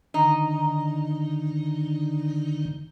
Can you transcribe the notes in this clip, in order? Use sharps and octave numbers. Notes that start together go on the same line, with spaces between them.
D3 D#3 D#4